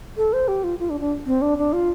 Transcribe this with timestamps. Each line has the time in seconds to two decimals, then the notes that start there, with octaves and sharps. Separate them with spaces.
0.17 A4
0.33 C5
0.48 G4
0.64 F4
0.79 F4
0.90 D4
1.00 D4
1.26 C4
1.42 D4
1.58 D4
1.73 F4